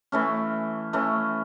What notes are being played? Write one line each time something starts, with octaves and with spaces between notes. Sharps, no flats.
E3 A3 C#4
E3 A3 C#4